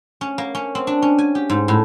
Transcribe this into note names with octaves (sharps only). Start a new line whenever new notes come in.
C#4
A#3
C#4
C4
D4
C#4
G#5
G4
G#2
A2